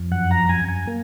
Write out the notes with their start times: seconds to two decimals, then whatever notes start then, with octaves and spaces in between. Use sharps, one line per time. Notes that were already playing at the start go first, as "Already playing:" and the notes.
Already playing: F2
0.11 F#2 F#5
0.31 A#5
0.49 F#2 G#5
0.68 G#5
0.87 A#3